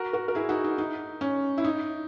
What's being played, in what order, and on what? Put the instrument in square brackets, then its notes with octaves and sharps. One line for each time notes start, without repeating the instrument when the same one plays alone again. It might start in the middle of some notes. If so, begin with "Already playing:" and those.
Already playing: [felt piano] F#4 A#4
F#4 A#4
A#4
E4 G#4
D#4 F#4
D#4
D#4
C#4
E4
D#4